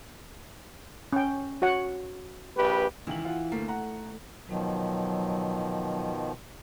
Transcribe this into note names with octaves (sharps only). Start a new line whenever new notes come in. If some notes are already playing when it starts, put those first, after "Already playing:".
C#4 G5
F#4 C#5 F#5
A#1 G4 B4
C#2 D#3 E3 F#7
F4 F#5
D2 A3 A#3
F#5 A#5
B2 D#3 F3 F#3